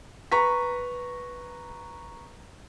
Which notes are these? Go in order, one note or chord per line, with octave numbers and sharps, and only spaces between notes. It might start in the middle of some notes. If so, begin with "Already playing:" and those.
B4 A#5 C#6 B6